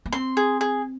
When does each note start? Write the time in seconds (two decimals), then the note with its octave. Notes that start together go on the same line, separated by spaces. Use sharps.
0.06 A#3
0.13 C4 C6
0.37 G#4
0.61 G#4